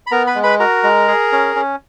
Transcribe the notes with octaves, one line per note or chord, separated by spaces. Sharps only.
B5
B3 A#4 A#5
B4 B5
G#3
B4 B5
F#4 A#4 A#5
G#3
G#4
C#4
C#4